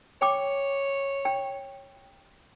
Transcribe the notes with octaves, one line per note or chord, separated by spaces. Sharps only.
C#5 G5 D6
G5